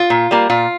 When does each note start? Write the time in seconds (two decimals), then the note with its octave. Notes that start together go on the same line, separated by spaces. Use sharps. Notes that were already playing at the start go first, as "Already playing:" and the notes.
Already playing: F4
0.10 A#2
0.31 G3 A#3
0.50 A#2 F4